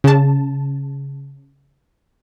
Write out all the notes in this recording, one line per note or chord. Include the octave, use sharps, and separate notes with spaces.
C#3 A5